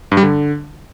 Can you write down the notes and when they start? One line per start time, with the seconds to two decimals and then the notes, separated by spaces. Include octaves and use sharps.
0.12 G2
0.17 G3
0.23 D3